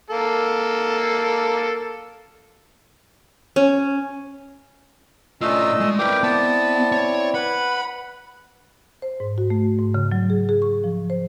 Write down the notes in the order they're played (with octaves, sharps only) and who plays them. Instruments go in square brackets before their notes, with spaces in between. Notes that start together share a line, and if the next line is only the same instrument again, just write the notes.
[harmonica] A#3 A4
[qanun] C#4
[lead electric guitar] A2 F4 [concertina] A3 D#5 E6 [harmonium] C#4 D4
[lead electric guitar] G#3
[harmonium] C4 E4 D5 [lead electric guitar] A#4 B4 [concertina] G5 D6
[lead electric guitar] B3 [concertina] A5
[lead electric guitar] C#5
[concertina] B4 F#5 [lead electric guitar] B5
[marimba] C5
G#2
F#4
A3
G#2
C#3
F#3
G#4
G#4
C#6
F3
C5